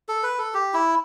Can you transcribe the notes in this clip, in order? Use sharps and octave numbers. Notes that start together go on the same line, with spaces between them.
A4
B4
A4
G4
E4